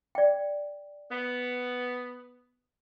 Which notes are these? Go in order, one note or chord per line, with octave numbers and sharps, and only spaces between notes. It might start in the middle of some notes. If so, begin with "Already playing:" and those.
D5 G5
B3